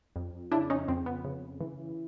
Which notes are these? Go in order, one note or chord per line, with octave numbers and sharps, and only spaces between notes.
F2
C#3 D4 E4
C#4 D#4
F2 C4
B3
C#3
E3